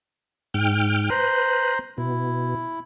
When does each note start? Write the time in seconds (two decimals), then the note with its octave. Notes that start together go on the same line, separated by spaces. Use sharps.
0.54 G#2 G5 F6
1.10 B4 C5 A#5 C6
1.98 B2 E4